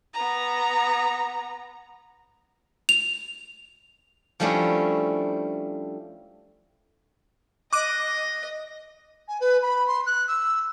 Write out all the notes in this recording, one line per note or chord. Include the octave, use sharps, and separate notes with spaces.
B3 A#5
F7
F3 G3 A3 C#4 D4 E4
D#5 D6 F#6 D#7
G#5
B4
B5
C6
F#6
E6